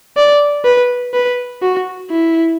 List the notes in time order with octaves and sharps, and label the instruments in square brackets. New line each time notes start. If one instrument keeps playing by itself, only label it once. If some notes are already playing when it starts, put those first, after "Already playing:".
[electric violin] D5
B4
B4
F#4
E4